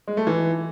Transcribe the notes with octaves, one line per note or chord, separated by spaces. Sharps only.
G#3
A3
E3